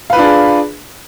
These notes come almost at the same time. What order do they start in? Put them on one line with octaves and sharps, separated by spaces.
F5 B4 F4 D4 G#4